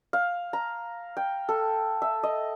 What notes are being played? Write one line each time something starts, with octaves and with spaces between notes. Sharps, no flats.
F5
A#5
G5
A4
E5
D#5